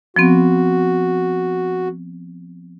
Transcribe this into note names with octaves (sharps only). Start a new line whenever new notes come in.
F3 B3 C4 F#4